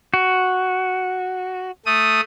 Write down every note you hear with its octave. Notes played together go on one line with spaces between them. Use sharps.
F#4
A3 D#6